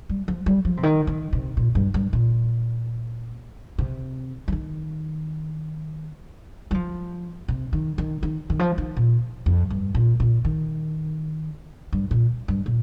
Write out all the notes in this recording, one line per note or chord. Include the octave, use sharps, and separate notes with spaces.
G3
F3
G3
F3
C3
D#3
D#3
C3
A#2
G2
G2
A#2
C3
F3
D#3
G3
F3
C3
D#3
D#3
D#3
D#3
F3
D#3
A#2
F2
G2
A#2
A#2
D#3
G2
A#2
G2
A#2